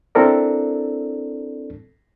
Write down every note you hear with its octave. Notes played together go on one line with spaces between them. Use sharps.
C4 D4 E4 A4 A#4 D5